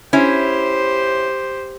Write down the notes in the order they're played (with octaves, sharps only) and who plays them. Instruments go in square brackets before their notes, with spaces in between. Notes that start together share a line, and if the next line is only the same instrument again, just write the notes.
[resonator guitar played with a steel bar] C#4 E4 [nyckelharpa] G4 C5